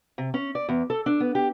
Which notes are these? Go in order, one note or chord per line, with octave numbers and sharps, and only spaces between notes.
C3
C#4
D5
E2
A4
D4
B3
G4